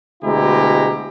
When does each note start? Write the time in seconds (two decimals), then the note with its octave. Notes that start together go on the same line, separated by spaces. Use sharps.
0.23 D2 B2 G#3 E4 G4 A#5